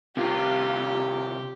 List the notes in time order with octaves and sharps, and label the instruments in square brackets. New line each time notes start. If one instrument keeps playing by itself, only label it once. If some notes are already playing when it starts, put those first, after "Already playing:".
[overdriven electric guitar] C2 F4 [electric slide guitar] C3 [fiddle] G4